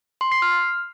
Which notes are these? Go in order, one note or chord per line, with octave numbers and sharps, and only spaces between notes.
C6
C7
F6